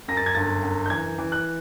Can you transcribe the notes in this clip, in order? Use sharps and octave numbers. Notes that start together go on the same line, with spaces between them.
F#2 A#6
A6
G#6
G1 A6
F#2
G6
E3 G#6
E3
F#6